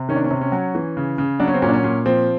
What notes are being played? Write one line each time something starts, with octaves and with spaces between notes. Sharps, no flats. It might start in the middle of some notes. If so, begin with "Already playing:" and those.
Already playing: C3
D#3 C#4
D4
C#4
C3
C#4
F#3
E3
C#3
C#3
F#3 D4
C#4
C4
A#2 C#4
D4
C#4
A#2
F3 C4